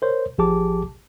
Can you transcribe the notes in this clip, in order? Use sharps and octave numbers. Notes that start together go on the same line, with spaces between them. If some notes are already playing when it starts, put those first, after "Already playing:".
A#4 C5 C#5
A1 F3 G4 G#4 A5 D6